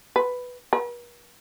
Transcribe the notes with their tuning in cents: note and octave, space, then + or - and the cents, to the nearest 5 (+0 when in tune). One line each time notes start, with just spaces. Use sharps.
B4 +5
B4 -45